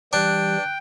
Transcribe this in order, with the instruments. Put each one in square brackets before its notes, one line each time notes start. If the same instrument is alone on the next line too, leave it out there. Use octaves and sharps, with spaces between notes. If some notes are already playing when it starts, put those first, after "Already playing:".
[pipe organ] E3 G3 G4 [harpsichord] D4 [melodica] G5 [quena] F#6